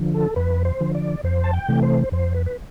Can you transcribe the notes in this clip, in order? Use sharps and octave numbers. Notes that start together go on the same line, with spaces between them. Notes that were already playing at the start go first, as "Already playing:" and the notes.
Already playing: D3 F3
A4
F2 B4
C5
D3 F3
D5
F2 C5
A5
G5
C3 E3 A3
C5
F2 C5
B4
B4